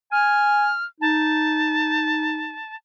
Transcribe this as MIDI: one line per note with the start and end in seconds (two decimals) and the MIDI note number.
0.12 0.68 80
0.12 0.84 89
1.01 2.58 63
1.01 2.75 81